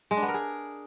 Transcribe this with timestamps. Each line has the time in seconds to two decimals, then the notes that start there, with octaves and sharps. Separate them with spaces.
0.11 G#3
0.17 D4
0.22 B3
0.28 A#4
0.34 G#4